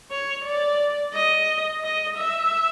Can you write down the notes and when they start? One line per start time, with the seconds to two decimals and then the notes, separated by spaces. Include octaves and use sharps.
0.11 C#5
0.45 D5
1.14 D#5
1.83 D#5
2.17 E5